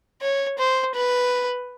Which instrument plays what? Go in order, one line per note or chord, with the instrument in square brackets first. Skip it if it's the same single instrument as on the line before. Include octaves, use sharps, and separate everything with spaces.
[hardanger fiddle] C#5
C5
B4